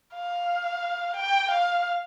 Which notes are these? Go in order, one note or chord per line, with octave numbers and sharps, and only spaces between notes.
F5
G5
F5